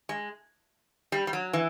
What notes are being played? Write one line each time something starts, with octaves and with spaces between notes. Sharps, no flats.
G#3
G3
G3
F#3
E3